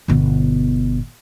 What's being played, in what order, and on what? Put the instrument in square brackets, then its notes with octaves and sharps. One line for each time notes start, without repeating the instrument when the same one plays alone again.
[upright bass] G1 B2